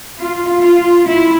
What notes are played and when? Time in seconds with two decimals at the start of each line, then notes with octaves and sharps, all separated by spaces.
0.20 F4
0.61 F4
1.08 E4